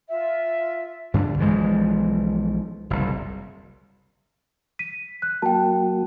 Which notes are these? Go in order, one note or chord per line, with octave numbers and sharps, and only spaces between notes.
F4 E5
G2 D3 D4
B1 E3 F3 G#3
F#1 C2
B6 D#7
F#6
F#3 A#3 F#4 G5 A5